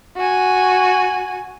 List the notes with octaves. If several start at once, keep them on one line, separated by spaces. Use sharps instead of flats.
F#4 G#5